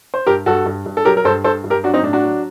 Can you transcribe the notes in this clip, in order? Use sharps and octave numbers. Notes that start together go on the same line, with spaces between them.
C5
G2 G4 A#4
G2 F#4 A4
G2
G2
A4
F#3 G4 A#4
A#4
G2 A4 C5
G2 A4 C5
G2
G4 A#4
F#3 D4 F#4
C4 D#4
A2 D4
D4 F#4
F#3